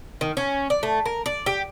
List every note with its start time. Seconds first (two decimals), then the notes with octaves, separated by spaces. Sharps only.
0.21 D#3
0.37 C#4
0.70 D5
0.83 A3
1.06 A#4
1.26 D5
1.46 G4